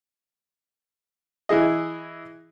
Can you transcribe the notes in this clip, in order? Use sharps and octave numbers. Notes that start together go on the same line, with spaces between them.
E3 E4 G#4 D#5